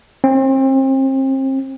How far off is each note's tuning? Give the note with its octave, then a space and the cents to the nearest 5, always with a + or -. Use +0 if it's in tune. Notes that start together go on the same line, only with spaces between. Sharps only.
C4 +35